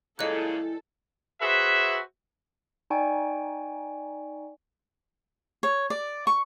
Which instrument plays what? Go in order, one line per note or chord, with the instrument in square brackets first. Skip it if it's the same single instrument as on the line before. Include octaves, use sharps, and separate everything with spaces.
[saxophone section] A#2 C#3 [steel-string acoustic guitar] E3 G3 G#3 [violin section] A4 [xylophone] D#5 F#6
[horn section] F#4 G#4 B4 C5 E5
[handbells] D#4 D5 G5 G#5 C#6
[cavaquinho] C#5
D5
C#6